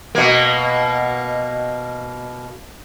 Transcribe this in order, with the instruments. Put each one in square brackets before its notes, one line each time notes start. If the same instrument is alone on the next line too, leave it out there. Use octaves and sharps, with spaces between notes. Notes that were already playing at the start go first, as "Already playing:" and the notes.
[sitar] B2 A#3